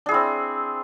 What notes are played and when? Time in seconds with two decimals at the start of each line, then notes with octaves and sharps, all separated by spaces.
0.06 D4
0.09 G#4
0.11 E4
0.14 C4